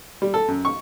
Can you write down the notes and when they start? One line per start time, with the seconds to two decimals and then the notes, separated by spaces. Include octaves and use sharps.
0.22 G3
0.34 A4
0.48 F#2
0.65 C#6